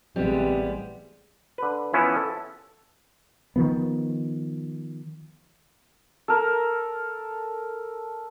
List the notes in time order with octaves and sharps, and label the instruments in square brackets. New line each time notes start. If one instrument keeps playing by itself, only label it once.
[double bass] A1 G#3 [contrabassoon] C3 [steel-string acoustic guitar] G3 B3
[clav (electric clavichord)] D3 B4
E3 F3 B3 C#4 E4
A4
[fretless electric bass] D#3 F3 B3
[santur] A4 A#4